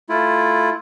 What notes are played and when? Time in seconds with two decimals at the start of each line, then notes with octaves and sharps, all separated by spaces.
0.09 A3 E4 F4